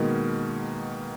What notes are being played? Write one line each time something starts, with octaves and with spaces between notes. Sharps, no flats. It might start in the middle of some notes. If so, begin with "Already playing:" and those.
Already playing: B2 D#3 G#3 A#3 B3